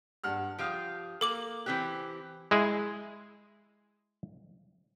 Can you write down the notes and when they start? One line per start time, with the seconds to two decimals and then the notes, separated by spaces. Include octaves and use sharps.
0.24 G2 F#5 F6
0.59 F3 G4 F5 D#6 F6 D7
1.21 A#3 A4 D6 F#7
1.66 E3 C4 G4 F#6 B6
2.51 G#3 E4 G#4